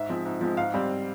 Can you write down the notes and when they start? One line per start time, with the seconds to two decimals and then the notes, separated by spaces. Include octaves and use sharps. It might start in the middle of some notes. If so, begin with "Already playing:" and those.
Already playing: G#2 E5
0.09 F3 G#3 C4
0.25 G#2
0.41 F3 G#3 C4
0.57 G#2 F5
0.74 G3 C4